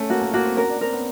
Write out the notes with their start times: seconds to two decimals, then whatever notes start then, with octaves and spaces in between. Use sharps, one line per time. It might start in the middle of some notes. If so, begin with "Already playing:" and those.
Already playing: A3 C#4
0.10 A#3 F#4
0.22 A#3
0.34 A#3 F#4
0.45 C4
0.57 C#4 A#4
0.69 D4
0.81 C4 A#4
0.93 B3